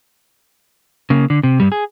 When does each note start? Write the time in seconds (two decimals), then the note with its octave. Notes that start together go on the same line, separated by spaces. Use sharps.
1.10 C#3 A#3
1.30 D3
1.43 C3
1.60 G2 G3
1.72 G#4